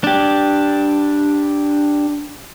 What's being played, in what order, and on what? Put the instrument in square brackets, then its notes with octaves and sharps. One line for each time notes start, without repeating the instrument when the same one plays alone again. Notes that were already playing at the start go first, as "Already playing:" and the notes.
[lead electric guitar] D4 G4